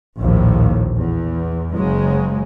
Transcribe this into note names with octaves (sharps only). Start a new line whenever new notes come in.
A#1 D#2 A2 F3
E2
F#1 C#3 F#3 G#3